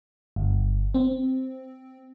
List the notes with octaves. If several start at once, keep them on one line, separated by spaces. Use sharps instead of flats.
G1
C4